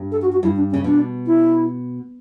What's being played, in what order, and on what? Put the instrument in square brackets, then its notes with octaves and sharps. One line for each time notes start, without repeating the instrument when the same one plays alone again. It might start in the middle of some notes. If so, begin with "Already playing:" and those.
Already playing: [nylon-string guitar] G2
[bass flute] A4
F#4
F#4
[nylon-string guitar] G2 [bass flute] E4
[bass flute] D4
C#4
[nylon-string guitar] C#3
[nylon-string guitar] B2 [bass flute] D4
[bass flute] E4